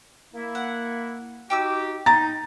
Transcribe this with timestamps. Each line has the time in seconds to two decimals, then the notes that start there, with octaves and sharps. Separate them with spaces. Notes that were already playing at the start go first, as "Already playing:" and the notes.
0.34 A#3 E4
0.55 F#5
1.50 D#4 F#4 G4 G5 D6 E6
2.06 D#4 A#5 A6